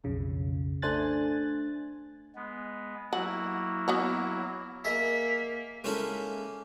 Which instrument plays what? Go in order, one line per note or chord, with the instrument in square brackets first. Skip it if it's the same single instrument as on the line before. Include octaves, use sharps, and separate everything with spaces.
[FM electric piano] B1 F2 C#3
A3 D4 C5 G#5 F#6 A6
[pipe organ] G#3 B3
[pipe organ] F#3 A#3 E4 [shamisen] F#4
[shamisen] B3 F#4 C#5
[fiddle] A#3 [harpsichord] G#4 D#5 E5 [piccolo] B6
[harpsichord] G#3 A#3 C#4 D#4 E4 A4